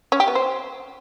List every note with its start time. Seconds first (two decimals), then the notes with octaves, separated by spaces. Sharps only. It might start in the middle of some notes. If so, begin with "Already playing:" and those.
0.12 C#4
0.20 G4
0.28 B3
0.35 C5